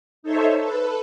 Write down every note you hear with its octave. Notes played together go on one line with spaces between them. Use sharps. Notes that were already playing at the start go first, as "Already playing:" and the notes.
D#4 A4 C5 C#5 E5
A4 B4